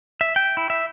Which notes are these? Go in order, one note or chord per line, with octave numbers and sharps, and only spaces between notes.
E5
G5
E4
E5